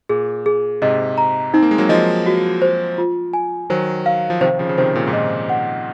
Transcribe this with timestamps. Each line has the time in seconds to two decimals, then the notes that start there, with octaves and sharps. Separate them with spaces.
0.09 A#2 G#4
0.46 G#4
0.82 G#2 C3 D#5
1.18 A#5
1.54 C4 D#4
1.63 A#3
1.71 G#3
1.78 F#3 A#3
1.89 F3 G#3 D#5
2.26 F#4
2.62 C5
2.98 F4
3.33 G#5
3.70 D#3 F#3 C5
4.06 F5
4.30 F3
4.41 C3 D#3 C5
4.59 C#3 F3
4.69 C#3
4.78 C3 D#3 C5
4.95 A#2 C#3
5.07 G#2
5.13 A#2 D#5
5.49 F#5